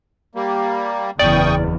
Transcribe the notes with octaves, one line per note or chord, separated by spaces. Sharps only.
G3 A#3
F#1 E2 D5 G5 C#6 D#6